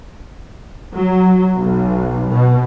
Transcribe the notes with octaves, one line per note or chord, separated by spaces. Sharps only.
F#3
B1
B2